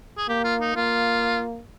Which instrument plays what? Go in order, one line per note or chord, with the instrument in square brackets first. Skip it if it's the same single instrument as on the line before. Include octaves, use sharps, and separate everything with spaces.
[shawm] G#4
[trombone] A#3 [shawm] G4
[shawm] F4
D#4
[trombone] A#3 [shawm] F4